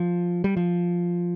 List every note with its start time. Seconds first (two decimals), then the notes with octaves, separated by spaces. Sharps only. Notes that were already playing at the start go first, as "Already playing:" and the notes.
Already playing: F3
0.44 G3
0.57 F3